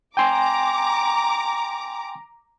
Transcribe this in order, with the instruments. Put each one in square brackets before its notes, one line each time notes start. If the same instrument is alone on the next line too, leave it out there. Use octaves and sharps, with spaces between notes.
[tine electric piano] G5 G#5 C6 [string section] A#5 D6